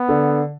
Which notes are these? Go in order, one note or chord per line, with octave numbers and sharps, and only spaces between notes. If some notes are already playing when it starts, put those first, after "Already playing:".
Already playing: B3
D3